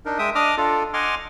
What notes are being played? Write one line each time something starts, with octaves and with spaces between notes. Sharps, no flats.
D4 D#4 A#4
G#3 E5 G5 D#6
D4 D#5 D6 D#6 F6
D4 F4 A4
D#5 F#5 G#5 C6 D6 F6